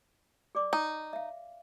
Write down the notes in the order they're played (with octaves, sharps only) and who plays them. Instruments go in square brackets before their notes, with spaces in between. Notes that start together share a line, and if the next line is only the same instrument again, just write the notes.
[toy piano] G#4 D5 D6
[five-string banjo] D#4
[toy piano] E5 F5